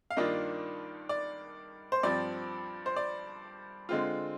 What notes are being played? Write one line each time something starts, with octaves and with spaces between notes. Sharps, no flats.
F5
G2 D#3 A#3 D4 F4 D#5
D5
C5
G2 F3 C4 D5
C5
D5
D3 G#3 C4 F4